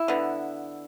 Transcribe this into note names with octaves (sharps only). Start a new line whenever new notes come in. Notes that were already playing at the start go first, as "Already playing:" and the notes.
Already playing: E4
D3 B3